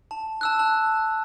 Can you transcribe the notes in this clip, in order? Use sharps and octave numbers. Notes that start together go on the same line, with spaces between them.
A5
A5 E6 F#6
A5